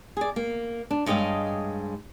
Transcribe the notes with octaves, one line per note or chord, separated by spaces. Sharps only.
G#4 D5
A#3
D4
G2 G#3 C#5 D#5 F5